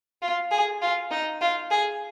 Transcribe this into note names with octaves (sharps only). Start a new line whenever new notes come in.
F4
G#4
F4
D#4
F4
G#4